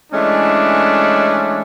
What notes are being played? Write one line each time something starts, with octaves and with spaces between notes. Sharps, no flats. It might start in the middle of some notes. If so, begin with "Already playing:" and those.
E3 G#3 A3 C#4 D4